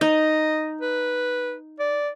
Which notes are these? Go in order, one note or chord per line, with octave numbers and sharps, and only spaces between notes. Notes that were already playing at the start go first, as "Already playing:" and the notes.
D#4 D#5
B4
D5